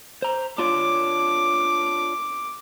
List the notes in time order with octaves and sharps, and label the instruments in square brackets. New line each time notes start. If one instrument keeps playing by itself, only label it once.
[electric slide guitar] C5 A#5
[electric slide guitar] D4 F4 C#5 [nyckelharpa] D6